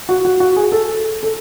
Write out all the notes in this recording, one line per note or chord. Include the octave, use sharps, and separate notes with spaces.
F#4
F#4
F#4
G#4
A4
A4